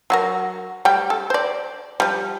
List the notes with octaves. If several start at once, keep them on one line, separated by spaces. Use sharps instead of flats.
F#3 F#4 A#4
G3 A3 G5
A4
C5 D5
F3 G3